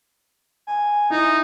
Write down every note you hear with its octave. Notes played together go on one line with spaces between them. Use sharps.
G#5
D#4 E4